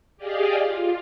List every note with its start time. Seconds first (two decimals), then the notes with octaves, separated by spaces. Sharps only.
0.17 G4 G#4 D5 D#5 F5
0.60 F4